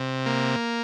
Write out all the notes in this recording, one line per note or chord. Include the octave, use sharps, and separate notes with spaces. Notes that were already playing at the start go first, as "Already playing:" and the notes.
Already playing: C3
A#3